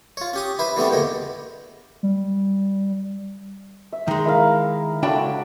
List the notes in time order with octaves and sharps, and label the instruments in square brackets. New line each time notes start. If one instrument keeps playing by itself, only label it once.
[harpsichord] F4 C#5
C#4 G4 D#6
E4 B4 C5
E3 G3 A3 B3 C4 D4
E2 G2 A#2 D3 D#5
[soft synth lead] G3
[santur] E5
[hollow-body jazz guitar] D#3 G#3
[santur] E4 A#4 F5
[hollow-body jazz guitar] C#2 D4 G5 [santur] E4 F#4 A4